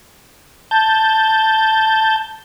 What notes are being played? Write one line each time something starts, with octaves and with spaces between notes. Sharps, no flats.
A5 G6